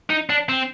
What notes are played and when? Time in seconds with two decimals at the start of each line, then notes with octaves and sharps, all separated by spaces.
0.10 D#4
0.29 D4
0.49 C4